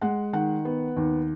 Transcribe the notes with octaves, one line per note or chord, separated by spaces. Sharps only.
G#3 F#5
D#3 F#5
B3
D#2